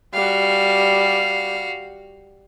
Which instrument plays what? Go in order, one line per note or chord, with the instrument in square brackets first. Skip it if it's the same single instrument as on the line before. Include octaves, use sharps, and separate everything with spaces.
[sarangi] G3 [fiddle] F#4 F5